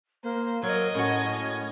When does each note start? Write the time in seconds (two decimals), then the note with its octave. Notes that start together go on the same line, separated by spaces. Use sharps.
0.23 A#3 C5
0.63 F#3 A#4 D#5 G#6
0.94 A2 C#4 F#4